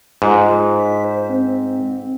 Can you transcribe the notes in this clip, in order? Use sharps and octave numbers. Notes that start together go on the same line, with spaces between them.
G#2 F4
B6
C5
C4